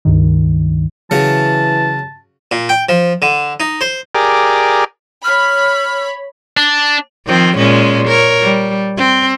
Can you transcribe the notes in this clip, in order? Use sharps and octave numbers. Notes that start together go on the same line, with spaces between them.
C#2 G2 D#3
C#3 E3 F#3 A5
A#2
G5
F3
D3
D#4
C5
G4 G#4 A#4 D5
C#5 B5 F6
D4
D#3 F3 C4
A#2 G#3 C#4
A#4 C#5
G3
C4